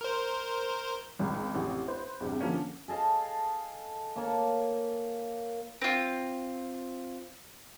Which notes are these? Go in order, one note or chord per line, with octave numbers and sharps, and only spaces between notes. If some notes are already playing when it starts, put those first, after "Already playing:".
A#4 C5
G#1 C#2
A1 F2 C3
B4 C5
E2 G2 C3
D3 F3 A#3 C#4
G#4 A4 D#5 F5
A#3 C#5 A5 C#6
C4 F4